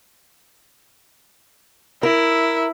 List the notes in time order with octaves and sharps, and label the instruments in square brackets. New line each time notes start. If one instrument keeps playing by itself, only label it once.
[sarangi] E4 [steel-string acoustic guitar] A#4